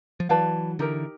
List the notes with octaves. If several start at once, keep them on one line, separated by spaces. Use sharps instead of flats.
F3
E3 F#3 B4 D5 F5 A5
D3 E3 D#4 G4 A#4